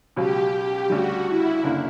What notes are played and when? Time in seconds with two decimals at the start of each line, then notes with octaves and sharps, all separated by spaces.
0.16 C#2 B2 F#3 G4
0.54 G4
0.90 D2 C#3 G3 F#4
1.28 E4
1.64 F#1 D3 A#3